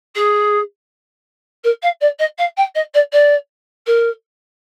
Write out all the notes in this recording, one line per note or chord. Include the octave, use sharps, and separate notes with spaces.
G#4
A#4
F5
D5
D#5
F5
G5
D#5
D5
D5
A#4